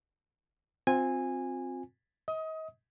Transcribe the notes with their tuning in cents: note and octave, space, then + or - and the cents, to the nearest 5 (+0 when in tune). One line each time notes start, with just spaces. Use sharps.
C4 +0 F4 +35 G#5 -15
D#5 +35 D#6 +20